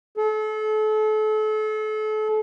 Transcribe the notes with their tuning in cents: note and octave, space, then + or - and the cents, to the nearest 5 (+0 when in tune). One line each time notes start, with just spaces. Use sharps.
A4 -35